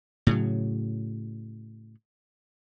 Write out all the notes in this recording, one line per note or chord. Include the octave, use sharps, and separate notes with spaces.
A2 C#3 F#3